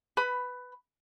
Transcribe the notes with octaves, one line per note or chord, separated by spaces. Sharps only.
B4 B5